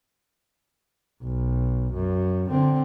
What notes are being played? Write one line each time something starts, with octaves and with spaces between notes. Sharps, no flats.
B1
F#2
D3 C4